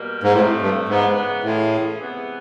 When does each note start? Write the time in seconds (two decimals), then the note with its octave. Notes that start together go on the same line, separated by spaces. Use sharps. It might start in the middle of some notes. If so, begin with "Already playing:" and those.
Already playing: B2 G3 A#3
0.23 G#2
0.33 A2 C3 F3 A3
0.61 G2
0.89 G#2 C#3 E3 G#3 B3 D#4
1.44 A2 E3 A3 C#4 F4 G#4
2.00 C3 E3 G#3 B3